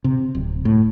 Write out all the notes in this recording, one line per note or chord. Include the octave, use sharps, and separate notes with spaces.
C3
D1
A2